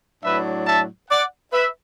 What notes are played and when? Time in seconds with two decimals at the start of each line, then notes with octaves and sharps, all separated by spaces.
0.23 A2 F#3 D4 B4 E5
0.66 E5 A5
1.10 D5 F#5
1.53 B4 E5